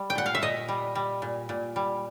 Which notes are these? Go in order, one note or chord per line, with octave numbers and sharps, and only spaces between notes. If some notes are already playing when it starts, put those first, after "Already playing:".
Already playing: G3
G5
A#2 F#5
F5
E5
A#2 D#5
G3
G3
A#2
A#2
G3